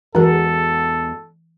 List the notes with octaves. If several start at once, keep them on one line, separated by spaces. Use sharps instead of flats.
E2 E3 G#3 F#4 A4 A#4